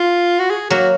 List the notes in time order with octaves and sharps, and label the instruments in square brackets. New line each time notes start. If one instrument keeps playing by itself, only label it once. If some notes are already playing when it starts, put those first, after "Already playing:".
Already playing: [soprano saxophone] F4
F#4
G#4
[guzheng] F#3 A#3 [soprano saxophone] F#4